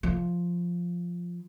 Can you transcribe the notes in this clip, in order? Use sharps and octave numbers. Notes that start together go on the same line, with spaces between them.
F3